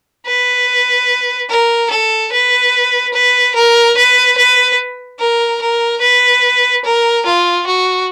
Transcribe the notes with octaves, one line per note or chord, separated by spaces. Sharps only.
B4
A#4
A4
B4
B4
A#4
B4
B4
A#4
A#4
B4
A#4
F4
F#4